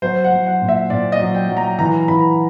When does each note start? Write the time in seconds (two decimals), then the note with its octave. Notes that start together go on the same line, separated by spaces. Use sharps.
0.02 F#3 C5
0.24 F#5
0.31 F#3
0.47 F#5
0.61 A#2
0.69 E5
0.90 A#2 D5
1.12 D#5
1.20 F#3
1.35 G5
1.49 F#3
1.57 A#5
1.78 E3 A#5
2.08 E3 B5